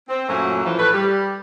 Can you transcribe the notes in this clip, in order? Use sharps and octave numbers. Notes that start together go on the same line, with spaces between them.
C4
F#2 A#2 F#3 A3 A#3 C#4
A2 E3 F3
A2 E3 A3 B4
G3 G4